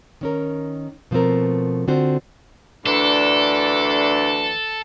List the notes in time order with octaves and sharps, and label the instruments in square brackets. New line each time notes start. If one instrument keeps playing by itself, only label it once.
[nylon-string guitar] D#3 C#4 A#4
B2 F3 A3 C4 A#4
D3 C4 F4 F#4 C5
[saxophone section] D2 E3 D4 [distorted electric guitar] A4